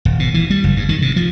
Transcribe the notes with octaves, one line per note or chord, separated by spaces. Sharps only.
D#1
B2
E3
G3
F#1
G2
D#3
C3
F3